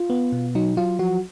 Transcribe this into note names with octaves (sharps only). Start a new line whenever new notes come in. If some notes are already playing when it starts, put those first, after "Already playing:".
Already playing: F4
B3
B2
F#3 D#4
F#3 F4
F3 F#4